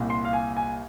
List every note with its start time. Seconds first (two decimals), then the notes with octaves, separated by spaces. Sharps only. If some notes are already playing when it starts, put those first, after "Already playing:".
Already playing: C2 A#2
0.10 C6
0.25 F5
0.33 G#5
0.57 G#5